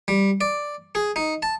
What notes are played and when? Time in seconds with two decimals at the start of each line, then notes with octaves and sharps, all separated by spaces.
0.08 G3
0.41 D5
0.95 G#4
1.16 D#4
1.42 A5